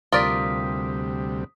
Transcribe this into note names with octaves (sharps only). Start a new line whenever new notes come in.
D2 C3 G3 F4 A#4 D5 D#6 B6